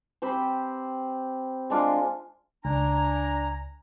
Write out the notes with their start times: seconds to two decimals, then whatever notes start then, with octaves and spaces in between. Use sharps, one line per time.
0.22 C4 G4 C5 B5
1.70 G#3 D4 F4
2.65 C#2 D4 G#5 A#5